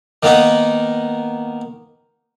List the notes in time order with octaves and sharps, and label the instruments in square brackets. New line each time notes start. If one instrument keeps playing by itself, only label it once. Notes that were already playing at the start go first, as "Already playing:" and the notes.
[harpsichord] D#3 A#3 B3 D#4